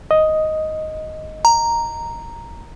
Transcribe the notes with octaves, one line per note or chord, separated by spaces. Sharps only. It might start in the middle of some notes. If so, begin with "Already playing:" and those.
D#5
A#5